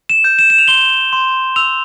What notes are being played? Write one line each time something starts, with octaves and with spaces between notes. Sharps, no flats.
E7
G6
E7
E7
F7
C6 G7
C6
E6 F7